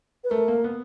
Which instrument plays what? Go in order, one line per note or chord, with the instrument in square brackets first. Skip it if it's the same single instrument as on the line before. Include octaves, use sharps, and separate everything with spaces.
[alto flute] B4
[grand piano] A3 [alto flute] A#4
[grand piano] A#3
B3